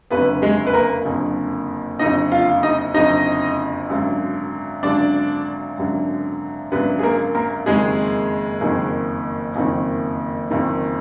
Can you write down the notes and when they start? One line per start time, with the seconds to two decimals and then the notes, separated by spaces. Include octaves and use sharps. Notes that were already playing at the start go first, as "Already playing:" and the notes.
0.11 F#1 F2 D3 B3 B4
0.42 G#3 G#4
0.67 B4
0.73 A#3 A#4
1.05 F#1 F2 D3
1.99 F#1 F2 D3 D#4 D#5
2.32 F4 F5
2.63 D#4 D#5
2.94 F#1 F2 D3 D#4 D#5
3.89 G#1 F#2 D3
4.83 G#1 F#2 D3 D4 D5
5.78 G#1 F#2 D3
6.72 G#1 F#2 D3 B3 B4
6.99 G#4
7.03 A#3 A#4
7.35 A#3 A#4
7.66 F#1 F2 D#3 G#3 G#4
8.61 F#1 F2 D#3
9.56 F#1 F2 D#3
10.50 F#1 F2 D#3